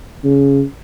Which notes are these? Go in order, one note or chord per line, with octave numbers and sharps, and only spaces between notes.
C#3